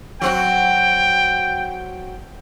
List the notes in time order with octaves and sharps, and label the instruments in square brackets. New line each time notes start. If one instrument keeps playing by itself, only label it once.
[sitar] F#3 C4 F#4 [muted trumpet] G5